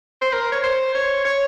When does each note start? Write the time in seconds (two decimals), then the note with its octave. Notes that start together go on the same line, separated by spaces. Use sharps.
0.22 C5
0.33 A#4
0.52 C#5
0.64 C5
0.95 C#5
1.25 C#5